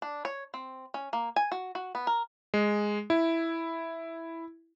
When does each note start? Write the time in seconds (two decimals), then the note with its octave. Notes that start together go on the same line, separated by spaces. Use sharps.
0.02 D4
0.25 C#5
0.54 C4
0.94 C#4
1.13 A#3
1.36 G#5
1.52 F#4
1.75 F#4
1.95 B3
2.07 A#4
2.54 G#3
3.10 E4